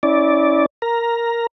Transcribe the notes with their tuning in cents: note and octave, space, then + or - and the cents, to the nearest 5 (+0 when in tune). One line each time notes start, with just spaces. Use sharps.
C#4 +0 E4 -35 D5 -5
A#4 +0 A#5 +10